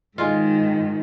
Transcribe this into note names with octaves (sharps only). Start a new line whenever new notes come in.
G#2 D#3 G#3 F4